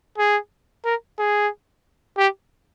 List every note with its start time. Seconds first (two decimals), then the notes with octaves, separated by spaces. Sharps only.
0.18 G#4
0.85 A#4
1.19 G#4
2.18 G4